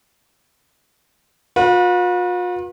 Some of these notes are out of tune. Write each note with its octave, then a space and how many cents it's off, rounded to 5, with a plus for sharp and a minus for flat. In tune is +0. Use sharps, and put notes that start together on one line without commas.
F4 +45 B4 -30